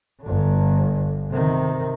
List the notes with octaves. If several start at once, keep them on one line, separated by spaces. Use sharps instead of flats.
G1 D3
C3 D#3